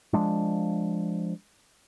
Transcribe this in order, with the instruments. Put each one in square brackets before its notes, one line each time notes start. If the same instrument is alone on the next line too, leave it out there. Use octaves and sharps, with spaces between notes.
[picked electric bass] F3 G#3 D4